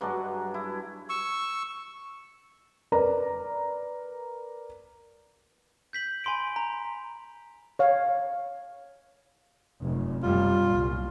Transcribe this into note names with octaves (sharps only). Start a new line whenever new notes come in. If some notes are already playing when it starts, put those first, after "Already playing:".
G2 F#3 G#3 D4
E4
C#6 E6
A#4 B4 D5 A#5
G6 B6 F#7
G#5 B5 C6 B6 D7
A#5
C#5 F5
F1 F#2
F#2 B2 G3 F4
C2 A#2